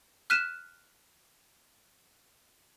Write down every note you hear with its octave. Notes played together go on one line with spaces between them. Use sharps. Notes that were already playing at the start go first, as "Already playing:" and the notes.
F6 F#6 B6 D#7 E7